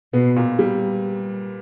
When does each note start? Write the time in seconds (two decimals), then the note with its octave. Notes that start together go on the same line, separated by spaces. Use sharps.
0.13 B2 B3
0.36 A#2
0.59 G3